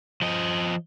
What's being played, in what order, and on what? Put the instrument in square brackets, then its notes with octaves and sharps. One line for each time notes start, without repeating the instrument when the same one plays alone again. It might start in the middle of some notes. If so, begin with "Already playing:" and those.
[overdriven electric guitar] F3 D#5